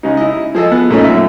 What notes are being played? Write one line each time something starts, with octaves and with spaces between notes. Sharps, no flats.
C#3 G#3 D#4
E4 D#5
F3 G#4 A4 D#5
B3
A#2 A3 C#4 D#4
F#2 E5